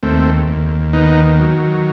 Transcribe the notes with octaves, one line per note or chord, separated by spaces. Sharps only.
D#2 A3 C4
D#2
D#3 B3 D#4
F#3